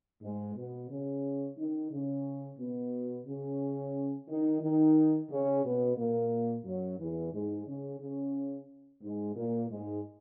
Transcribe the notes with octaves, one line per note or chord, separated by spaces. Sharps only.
G#2 G#3
B2 B3
C#3 C#4
D#3 D#4
C#3 C#4
B2 B3
C#3 C#4
D#3 D#4
D#3 D#4
C#3 C#4
B2 B3
A#2 A#3
F#2 F#3
E2 E3
G#2 G#3
C#3 C#4
C#3 C#4
G#2 G#3
A#2 A#3
G#2 G#3